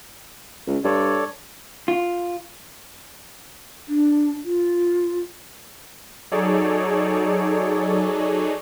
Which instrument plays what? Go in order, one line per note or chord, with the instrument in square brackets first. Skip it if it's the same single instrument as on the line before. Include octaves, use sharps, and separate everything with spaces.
[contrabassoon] C#2
[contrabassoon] G2 [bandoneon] A4 C#5 D5
[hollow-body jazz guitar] F4
[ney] D4
F4
[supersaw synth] F#3 D#4 G#4 A4 C#5 D5